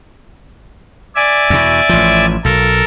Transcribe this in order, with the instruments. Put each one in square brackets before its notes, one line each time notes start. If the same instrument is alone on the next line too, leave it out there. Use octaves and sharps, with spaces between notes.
[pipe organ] D5 E5 G#5
[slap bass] E2 B2
A1 F3
[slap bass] B1 [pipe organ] A4 A#4